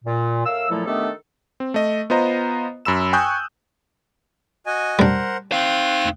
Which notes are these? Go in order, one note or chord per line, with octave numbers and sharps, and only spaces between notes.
A#2
A2 A#4 F5 E6
A#2 F3 F#3 A3 E4 A4
D#3 A3 B3 D4 G4 A4
C4
A3 D#5
B3 F4 C5 D#5 A#5
F#2 B5 E6 E7
G5 G#5 C#6 D#6 F#6 G6
F#4 D#5 G#5
G3 D4 A#4 C5 F#5
C4 D#4 F5 F#6